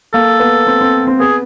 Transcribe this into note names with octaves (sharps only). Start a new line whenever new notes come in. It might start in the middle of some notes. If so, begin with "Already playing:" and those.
A#3 A4
B3
C4
C4
C4
B3 G#4